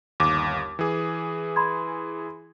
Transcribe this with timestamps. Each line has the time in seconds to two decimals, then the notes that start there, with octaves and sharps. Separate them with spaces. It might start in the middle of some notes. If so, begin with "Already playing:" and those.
0.20 G1 D#2 D6
0.79 E3 G#4
1.56 B5 C6 G#6